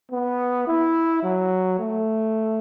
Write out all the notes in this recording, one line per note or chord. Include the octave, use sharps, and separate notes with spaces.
B3
E4
F#3
A3